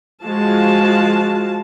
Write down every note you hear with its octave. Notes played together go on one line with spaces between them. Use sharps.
F3 G#3 F#4 F5 A5